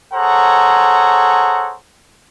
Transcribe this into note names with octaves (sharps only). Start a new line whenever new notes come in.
G#4 A4 C5 C#5 F#5 A#5